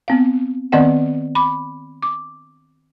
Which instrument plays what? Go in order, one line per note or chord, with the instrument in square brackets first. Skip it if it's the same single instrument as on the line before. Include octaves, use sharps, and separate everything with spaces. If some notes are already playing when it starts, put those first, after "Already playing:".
[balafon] B3 C4 F5
D#3 B3 C4 D5 D#5 F#5
B5 D6
D6